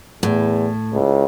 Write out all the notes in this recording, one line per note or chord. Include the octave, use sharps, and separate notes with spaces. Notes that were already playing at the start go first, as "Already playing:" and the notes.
E2 A2
C#2